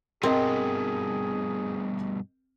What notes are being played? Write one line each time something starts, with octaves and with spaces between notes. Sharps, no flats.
G2 B2 C4 G#4 A#4 D#5 G5